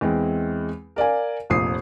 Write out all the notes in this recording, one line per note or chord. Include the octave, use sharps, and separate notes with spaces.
E2 E3 G#3 C4
A#4 D5 F5 G#5
F1 A#1 D#6 C7